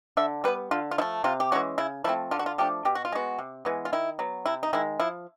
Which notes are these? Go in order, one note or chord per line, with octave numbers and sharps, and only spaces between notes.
D3 E5
G3 B3 B4
D3 F4
F4
F3 A3 E4
C3 F4
G4
E3 G#3 C#4 F#4
C#3 E4
F3 A3 C4 E4
D3 F4
F#4
F4
F3 A3 D4 G4
B2 G4
F#4
F4
G#3 B3 F#4
C3
E3 G#3 B3
F4
D#3 E4
F#3 B3
C3 E4
D#4
D#3 G#3 E4
F3 E4